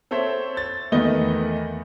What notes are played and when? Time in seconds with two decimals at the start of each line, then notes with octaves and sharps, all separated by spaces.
0.11 C4 A4 C5 C#5 E5
0.57 A6
0.92 E2 D#3 A3 B4 D#5 G7